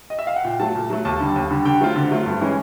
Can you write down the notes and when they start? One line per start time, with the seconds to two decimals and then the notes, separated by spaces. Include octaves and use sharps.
0.10 D#5
0.19 E5
0.27 F5
0.36 F#5
0.44 A#2 G5
0.60 F#3 A3 A5
0.75 A#2
0.90 F#3 A3
1.05 D#2 A5
1.20 D3 G3
1.36 D#2
1.50 D3 G3
1.65 D3 G5
1.81 F#3 A3 C4 F4
1.96 D3
2.11 F#3 A3 C4 F4
2.26 G2
2.41 E3 G#3 C#4 E4